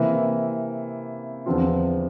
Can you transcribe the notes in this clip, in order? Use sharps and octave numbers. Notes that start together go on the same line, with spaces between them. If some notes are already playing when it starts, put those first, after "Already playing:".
Already playing: C3 E3 A#3
E2 D3 F3 C4 F4